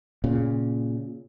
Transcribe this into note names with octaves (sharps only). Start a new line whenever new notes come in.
A#2 C#3